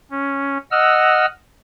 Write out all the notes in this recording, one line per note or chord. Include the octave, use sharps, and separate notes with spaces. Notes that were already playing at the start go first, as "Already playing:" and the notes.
C#4
D#5 F#5 E6 F6